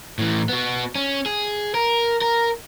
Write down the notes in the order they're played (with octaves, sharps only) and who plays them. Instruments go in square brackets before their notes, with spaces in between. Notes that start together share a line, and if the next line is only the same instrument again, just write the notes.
[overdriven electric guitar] A2 E3
B3 F#4
C#4
G#4
A#4
A#4